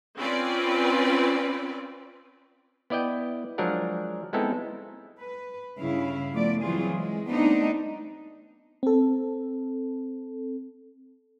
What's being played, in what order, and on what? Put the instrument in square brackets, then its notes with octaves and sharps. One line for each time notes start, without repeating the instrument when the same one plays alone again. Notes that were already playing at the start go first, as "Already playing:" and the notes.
[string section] C4 C#4 F4 B4 D5
[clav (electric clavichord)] B3 E4 D5 D#5 G5
F3 F#3 G#3 D4 A#4 F#5
G#3 B3 C4 D#4 E4 A4
[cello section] B4
G2 C#3 E4 F5
F3 A3 B3 D5
E3 F#3 G3 C4 F4 G#4
G#3
G3 A3 B3 C4 D4 D#4
[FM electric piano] C4 A4